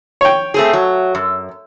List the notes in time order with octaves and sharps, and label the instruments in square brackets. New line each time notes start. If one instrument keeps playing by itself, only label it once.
[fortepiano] C#5 G5
[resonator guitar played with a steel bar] A3 C4 G#4
F#3
F#2